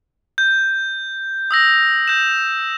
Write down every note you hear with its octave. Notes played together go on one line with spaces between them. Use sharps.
G6
D#6 E6 A#6
G6 E7